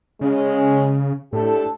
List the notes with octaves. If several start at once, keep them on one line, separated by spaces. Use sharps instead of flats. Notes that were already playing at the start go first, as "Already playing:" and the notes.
C#3 G#3 C#4
A2 D4 G4 A4